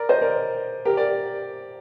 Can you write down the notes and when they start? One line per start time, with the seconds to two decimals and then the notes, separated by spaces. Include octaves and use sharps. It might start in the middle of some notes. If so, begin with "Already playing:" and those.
Already playing: A#4 D5
0.09 C5 D#5
0.22 A#4 D5
0.85 G4 A#4
0.97 A#4 D5